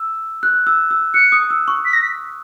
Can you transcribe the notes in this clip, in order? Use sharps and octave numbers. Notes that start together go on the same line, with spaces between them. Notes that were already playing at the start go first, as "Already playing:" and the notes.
Already playing: E6
F#6
E6
E6
F#6 C#7
D#6
E6
C#6
B6
A#6
B6